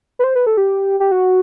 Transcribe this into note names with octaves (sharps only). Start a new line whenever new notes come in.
B4
C5
B4
A4
G4
G4
F#4